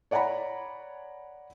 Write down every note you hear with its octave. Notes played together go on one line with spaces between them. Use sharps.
C#5 D5 F#5 G#5 A#5 B5